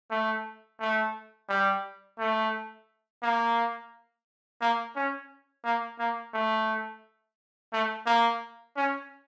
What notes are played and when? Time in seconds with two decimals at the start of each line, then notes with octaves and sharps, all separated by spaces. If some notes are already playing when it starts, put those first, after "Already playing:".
0.11 A3
0.80 A3
1.49 G3
2.19 A3
3.23 A#3
4.61 A#3
4.96 C#4
5.64 A#3
5.99 A#3
6.34 A3
7.73 A3
8.06 A#3
8.77 C#4